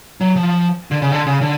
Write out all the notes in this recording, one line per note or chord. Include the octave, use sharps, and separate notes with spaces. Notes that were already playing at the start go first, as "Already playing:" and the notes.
F#3
F3
D3
C#3
D3
C#3
D3